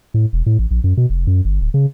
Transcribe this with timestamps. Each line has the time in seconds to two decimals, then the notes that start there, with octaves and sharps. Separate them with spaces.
0.14 A2
0.33 E1
0.46 A2
0.59 A1
0.71 A#1
0.84 F#2
0.97 B2
1.10 F1
1.27 F#2
1.45 G1
1.61 D1
1.74 C#3